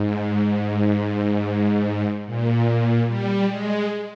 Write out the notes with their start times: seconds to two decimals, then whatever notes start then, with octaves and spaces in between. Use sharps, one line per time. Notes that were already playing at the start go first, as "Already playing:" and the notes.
Already playing: G#2
2.26 A#2
3.07 G3
3.48 G#3